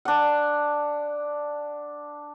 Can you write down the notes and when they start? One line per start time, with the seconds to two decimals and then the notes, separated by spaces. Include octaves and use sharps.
0.05 D4 F#5